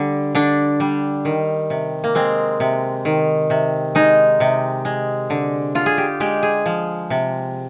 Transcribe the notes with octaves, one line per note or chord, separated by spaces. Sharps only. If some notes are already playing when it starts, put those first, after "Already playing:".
Already playing: D3 G3
D3 D4
G3
D#3
C3
A#3
G#3 C4
C3
D#3
C3
G#3 D#4
C3
G#3
D3
D3 F4
G#4
G4
G#3 G4
G#4
F3
C3